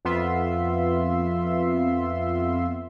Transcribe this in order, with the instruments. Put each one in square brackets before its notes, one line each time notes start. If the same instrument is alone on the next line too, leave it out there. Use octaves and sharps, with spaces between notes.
[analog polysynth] F2 B3 F4 E5 C6